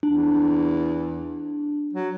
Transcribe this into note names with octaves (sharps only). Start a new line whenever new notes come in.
E2 D4
F#3